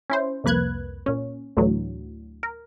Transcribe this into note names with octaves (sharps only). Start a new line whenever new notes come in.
C#4 E4 C5
C2 F2 A#3 B4 F#6 G#6
A#2 C#4
D2 A2 D3 E3 F#3
A#4